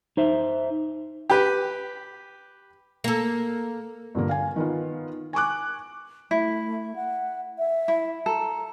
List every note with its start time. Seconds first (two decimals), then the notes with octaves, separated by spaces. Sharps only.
0.17 D#4 C5 E5
1.30 G4 B4
3.04 A#3 A4
4.15 G2 A#2 D3 A#3
4.29 F5 G#5
4.56 D#3 B3 F4
5.33 G#5 C#6 D6 F#6
6.31 A3 E4
6.96 F#5
7.58 E5
7.88 E4
8.26 A4 A#5